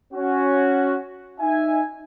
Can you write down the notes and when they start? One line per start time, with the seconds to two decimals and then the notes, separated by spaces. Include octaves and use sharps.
0.13 C#4 F#4
1.40 D#4 E5 G#5